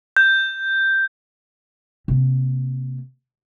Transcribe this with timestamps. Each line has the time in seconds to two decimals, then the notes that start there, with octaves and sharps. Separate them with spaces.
0.17 G6
2.08 C3 A#3